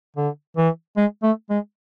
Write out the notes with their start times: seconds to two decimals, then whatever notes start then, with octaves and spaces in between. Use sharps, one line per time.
0.16 D3
0.56 E3
0.97 G#3
1.23 A3
1.50 G#3